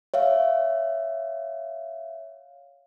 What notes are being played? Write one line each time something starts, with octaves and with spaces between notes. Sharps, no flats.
C#5 E5 F5